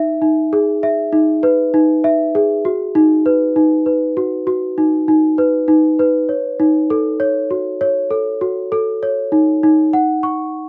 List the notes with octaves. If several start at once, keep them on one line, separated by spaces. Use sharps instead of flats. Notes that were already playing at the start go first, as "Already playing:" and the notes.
Already playing: D#4 E5
D#4
G#4
E5
D#4
B4
D#4
E5
G#4
F#4
D#4
B4
D#4
B4
F#4
F#4
D#4
D#4
B4
D#4
B4
C#5
D#4
A4
C#5
F#4
C#5
A4
F#4
A4
C#5
D#4
D#4
F#5
C#6